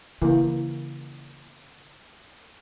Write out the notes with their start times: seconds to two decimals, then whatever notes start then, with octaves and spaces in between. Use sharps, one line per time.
0.22 C#3 E3 A#3